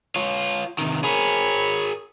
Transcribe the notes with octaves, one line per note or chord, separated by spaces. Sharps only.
F4 C#5
C3 D#3
G#4 A#4 C#5 B5